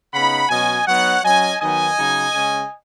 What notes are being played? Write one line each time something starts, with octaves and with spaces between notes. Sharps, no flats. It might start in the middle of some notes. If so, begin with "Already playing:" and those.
C#3 B3 D#4 F#5 B5
B2 F#3 C#4 D#5 G#5
F#3 B3 D#4 C#5 F#5
F#3 C#4 D#5 G#5
D#3 F#3 B3 D#4 D#5 G#5
C#3 F#3 D#4
C#3 G#3 C#4